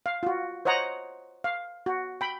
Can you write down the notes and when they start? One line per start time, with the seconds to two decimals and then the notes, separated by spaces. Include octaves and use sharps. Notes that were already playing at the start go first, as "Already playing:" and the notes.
0.06 F5
0.23 F4 F#4
0.65 C5 C#5 D#5 F#5 A#5
1.44 F5
1.86 F#4
2.21 G5 B5